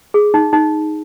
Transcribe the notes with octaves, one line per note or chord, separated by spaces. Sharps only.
G#4
D#4
D#4